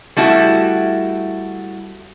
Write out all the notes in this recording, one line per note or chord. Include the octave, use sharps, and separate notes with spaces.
G3 A3 E4 F#4